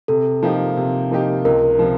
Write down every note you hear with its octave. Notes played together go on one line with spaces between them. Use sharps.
C3 A4
F3 A#3 D#4 G4
C3
F3 A#3 D#4 G4
C#2 A#4
C3 F3